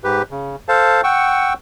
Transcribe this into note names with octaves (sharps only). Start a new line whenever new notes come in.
G#2 G4 B4
C#3
A4 C5 F5 A5
F#5 G5 C#6 E6